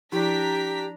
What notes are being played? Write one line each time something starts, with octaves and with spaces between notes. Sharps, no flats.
F3 D4 E4 G4 A#5 B6